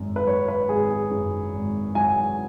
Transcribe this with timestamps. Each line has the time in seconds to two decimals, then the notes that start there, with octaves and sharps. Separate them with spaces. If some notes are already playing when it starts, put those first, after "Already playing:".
Already playing: G#1 F#2
0.16 B4
0.26 F#3 C#5
0.48 B4
0.69 G#1 G#4
0.89 G#4
1.10 F#2
1.53 G#1
1.95 F#3 G#5